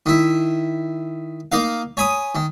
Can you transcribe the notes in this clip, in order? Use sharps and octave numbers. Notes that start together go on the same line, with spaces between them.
D#3 E4
A#3 D#4 A#4 F5
C#5 G#5 B5 D#6
D#3